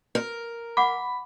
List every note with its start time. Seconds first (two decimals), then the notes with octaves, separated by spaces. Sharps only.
0.15 A#4
0.77 F#5 B5 D6